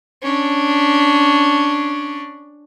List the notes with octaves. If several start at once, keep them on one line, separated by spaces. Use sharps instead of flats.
C#4 D4